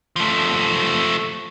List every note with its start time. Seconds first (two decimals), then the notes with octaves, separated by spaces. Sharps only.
0.16 F3 A3